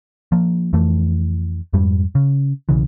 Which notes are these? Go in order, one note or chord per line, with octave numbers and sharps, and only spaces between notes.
F3 A#3
F2 E3 A3
F2 G#2 G3
C#3
B1 C#3 E3